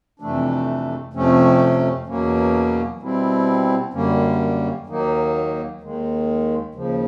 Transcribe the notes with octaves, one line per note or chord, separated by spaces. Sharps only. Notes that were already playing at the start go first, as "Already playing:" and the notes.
F2 C3 E3 A3 D4
F2 C3 F3 A3 C#4
E2 B2 F#3 A#3 C#4
B2 G3 C4 E4
F#2 D3 G3 A#3 C#4
D#2 D#3 F#3 A#3 D#4
D#2 D#3 G#3
D#2 C#3 F3